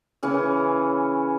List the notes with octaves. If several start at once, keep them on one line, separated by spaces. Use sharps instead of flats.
C#3 E3 C#4